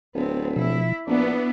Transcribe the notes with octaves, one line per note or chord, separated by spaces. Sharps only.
D1 B3 C4
B2 F3 E4 E5
A#1 B3 D4 E4 D5